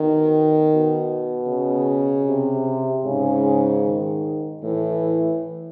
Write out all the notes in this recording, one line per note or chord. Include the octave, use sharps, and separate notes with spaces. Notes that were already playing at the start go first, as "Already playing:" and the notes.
Already playing: B2 D#3
B2
C#3
C3
G#2 C#3
D#3
A2 E3